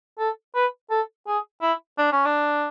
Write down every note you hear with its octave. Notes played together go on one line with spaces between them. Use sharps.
A4
B4
A4
G#4
E4
D4
C#4
D4